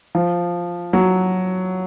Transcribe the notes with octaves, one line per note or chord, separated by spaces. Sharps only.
F3
F#3